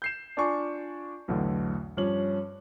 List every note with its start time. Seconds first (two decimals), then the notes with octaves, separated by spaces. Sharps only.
0.02 G6 C7 E7
0.37 D4 F4 D5 G#5 C#6
1.28 B1 E2 A2 D3
1.97 G2 F3 C#4 F#7